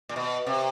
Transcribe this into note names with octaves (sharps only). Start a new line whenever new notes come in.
A#2
B2
C3